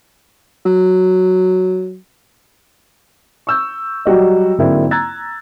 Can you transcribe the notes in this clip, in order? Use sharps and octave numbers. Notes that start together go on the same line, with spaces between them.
F#3
C#6 E6 G6
F#3 G3 F#4 D#5
G#2 D3 F#3 A#3 C4 E4
A#5 E6 F#6 G#6 A6